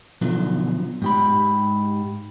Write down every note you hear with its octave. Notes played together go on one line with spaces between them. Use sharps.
B2 D3 F3 F#3
G#2 G4 B5